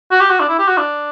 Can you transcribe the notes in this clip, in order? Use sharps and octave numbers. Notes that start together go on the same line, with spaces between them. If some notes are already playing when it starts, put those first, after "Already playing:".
F#4
G4
F#4
D4
E4
G4
F#4
D4